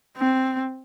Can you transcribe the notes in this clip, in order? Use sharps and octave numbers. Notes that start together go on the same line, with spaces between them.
C4